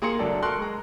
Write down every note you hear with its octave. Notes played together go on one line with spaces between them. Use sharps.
A#3 G#4 A#5 C6 C#7
F#1 F#3 D4 A4
A4 A#4 C6 C#6 F#6
G#3 A#5